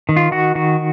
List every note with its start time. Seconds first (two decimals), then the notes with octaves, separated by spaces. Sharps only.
0.09 D#3
0.16 F4
0.32 D#3 F#4
0.55 D#3 F#4